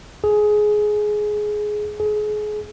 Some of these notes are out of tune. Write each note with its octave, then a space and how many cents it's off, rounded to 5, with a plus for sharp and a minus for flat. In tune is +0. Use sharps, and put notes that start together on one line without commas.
G#4 +15
G#4 +30